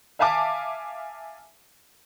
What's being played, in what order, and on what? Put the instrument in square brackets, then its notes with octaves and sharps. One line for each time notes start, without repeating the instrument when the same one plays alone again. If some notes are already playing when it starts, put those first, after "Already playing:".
[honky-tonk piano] E5 F5 G#5 A5 D6